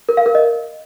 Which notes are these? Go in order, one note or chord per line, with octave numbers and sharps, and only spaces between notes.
A#4
F5
A#4
D#5